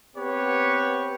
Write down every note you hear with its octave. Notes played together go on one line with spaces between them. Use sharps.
B3 C4 G4 B4 C#5